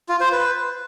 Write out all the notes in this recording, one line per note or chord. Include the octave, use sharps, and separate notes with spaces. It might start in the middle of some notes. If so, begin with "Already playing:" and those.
F4
C5
B4